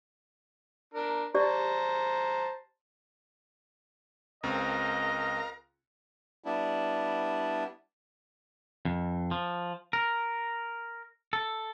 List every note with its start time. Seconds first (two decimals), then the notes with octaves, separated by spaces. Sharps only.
0.94 D4 A#4
1.34 G4 C5 D5 A5 A#5
4.43 C#2 C4 A#4 D#5 F5 A#5
6.44 G3 B3 D4 E4
8.85 F2
9.31 F3
9.93 A#4
11.33 A4